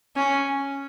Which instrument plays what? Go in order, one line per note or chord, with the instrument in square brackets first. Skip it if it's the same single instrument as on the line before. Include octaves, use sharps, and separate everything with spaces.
[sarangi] C#4